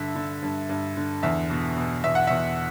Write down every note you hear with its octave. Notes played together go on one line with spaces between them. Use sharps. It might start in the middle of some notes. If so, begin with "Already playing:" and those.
Already playing: G2 D3 E5
D3
G2
G2
D3
E2 E5
B2
B2
E2 E5
F#5
E2 E5